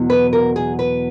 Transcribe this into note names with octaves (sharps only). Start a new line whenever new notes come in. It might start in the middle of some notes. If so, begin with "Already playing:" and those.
Already playing: E2 B2 F#3
B4
A#4
G#4
B4